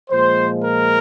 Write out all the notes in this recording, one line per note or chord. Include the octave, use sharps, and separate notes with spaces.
A#2 F3 G#3 C5
A#4